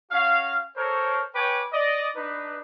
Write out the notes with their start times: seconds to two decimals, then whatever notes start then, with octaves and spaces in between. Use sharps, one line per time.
0.12 C#4 F#4 F5
0.77 A4 A#4 C5 C#5
1.35 B4 C#5 G5 G#5 D6
1.73 D5 D#5
2.16 D4 D#4 B4